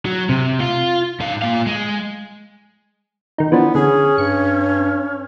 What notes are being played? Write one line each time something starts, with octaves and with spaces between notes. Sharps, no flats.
F#3
C3
F4
G#2 F5
A#2 F5
G#3
D#3 D#4
E3 F3 B3 D4
D3 C#4 G#4
G2 C#7